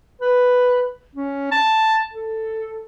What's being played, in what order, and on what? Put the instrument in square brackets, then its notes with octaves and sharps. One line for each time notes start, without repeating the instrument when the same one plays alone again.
[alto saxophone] B4
C#4
A5
A4